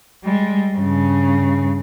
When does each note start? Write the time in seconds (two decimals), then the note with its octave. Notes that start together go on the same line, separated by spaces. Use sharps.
0.24 G3 G#3
0.76 G2 C#3